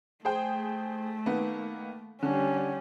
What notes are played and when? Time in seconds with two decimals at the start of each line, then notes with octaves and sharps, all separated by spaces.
0.25 A3 G#4 C5 G5
1.26 D#3 A#3 B3
2.22 D3 G3 C#4